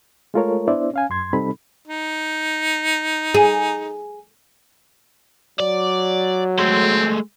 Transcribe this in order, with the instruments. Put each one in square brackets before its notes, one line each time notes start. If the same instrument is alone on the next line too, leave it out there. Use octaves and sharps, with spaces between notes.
[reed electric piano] G#3 A3 F4 A4 A#4 C#5
B3 D4 E4 C5 D5 E5
C#4 F5 G#5
F#2 C6 G#6
C3 G3 C4 D#4 A4 B5
[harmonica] D#4
[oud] G#4
[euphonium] F#3 [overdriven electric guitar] D5
[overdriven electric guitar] G#3 A3 [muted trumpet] C4